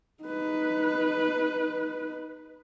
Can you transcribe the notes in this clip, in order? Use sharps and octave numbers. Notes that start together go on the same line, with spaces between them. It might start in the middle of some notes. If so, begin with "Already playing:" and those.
D#4 B4